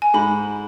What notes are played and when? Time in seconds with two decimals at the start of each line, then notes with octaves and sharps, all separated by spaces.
0.02 G#5
0.14 G#2 B5